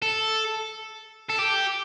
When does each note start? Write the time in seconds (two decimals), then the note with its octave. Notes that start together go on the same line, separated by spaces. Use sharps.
0.02 A4
1.30 A4
1.39 G4